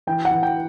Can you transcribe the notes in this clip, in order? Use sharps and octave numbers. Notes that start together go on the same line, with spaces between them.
E3 G5
F#5
E3
G5